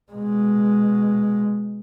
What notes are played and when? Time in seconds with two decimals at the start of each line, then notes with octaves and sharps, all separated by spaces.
0.12 B2 G#3